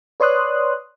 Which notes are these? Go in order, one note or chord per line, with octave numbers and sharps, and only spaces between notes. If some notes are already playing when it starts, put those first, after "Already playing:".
B4 C#5 D5 C6 D#6 F#6